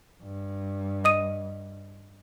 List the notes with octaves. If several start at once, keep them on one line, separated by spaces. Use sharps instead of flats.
G2
D#5 D#6 D#7